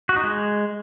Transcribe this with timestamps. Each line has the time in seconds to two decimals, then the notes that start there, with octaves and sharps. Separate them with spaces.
0.09 F#4
0.16 D#4
0.24 G#3